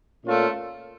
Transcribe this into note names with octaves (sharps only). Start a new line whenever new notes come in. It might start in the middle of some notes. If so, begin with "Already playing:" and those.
A#2 A3 C#4 F4